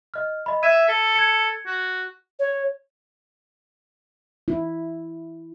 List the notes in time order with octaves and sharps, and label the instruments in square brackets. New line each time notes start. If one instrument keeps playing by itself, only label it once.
[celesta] D#5 F6
D#5 B5
[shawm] E5 [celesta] E6 G#6 D#7
[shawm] A4
[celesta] G#6 C#7
[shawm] F#4
[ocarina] C#5
[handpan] E4